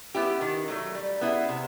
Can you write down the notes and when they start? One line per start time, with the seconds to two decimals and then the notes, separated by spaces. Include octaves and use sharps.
0.15 B3 E4 G4
0.41 D#3
0.68 F#3 A3
0.95 G3
1.21 B3 E4 G#4
1.49 C3